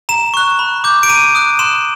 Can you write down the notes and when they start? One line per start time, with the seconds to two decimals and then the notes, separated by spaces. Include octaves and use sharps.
0.09 A#5 E7
0.34 C#6 F#6
0.59 B5
0.84 D6 G6
1.03 D7
1.09 A#5 D#7
1.35 D#6 F#6
1.59 C6 E7